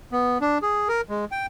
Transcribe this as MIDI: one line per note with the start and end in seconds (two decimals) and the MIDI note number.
0.12 0.38 59
0.41 0.58 62
0.62 0.88 68
0.88 1.01 70
1.09 1.25 56
1.32 1.46 79